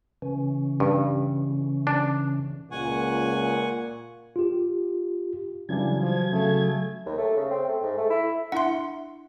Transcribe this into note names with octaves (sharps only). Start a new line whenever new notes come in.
C#3 E3 C#4
G2
D4
C#2 A#2 F#5 G#5 C#6
F4 G4
C#3 E3 F#3 G3 D4 G#6
F3
C#3 A3
D#2
A3
C#3
C4
A3
G#2
A3
E4
D4 E4 E5 F#5 C6